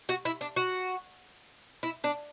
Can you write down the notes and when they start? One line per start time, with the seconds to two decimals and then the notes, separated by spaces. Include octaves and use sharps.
0.09 F#4
0.25 E4
0.41 D4
0.56 F#4
1.83 E4
2.04 D4